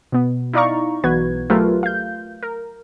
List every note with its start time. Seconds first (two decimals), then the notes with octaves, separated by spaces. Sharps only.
0.12 B2 B3
0.54 D#4 E4 D5 F5 A#5 C#6
1.04 B1 E3 B3 F#4 B4 G#6
1.50 F#3 A3 F4 G4 A#4 B4
1.83 F5 G6
2.43 A#4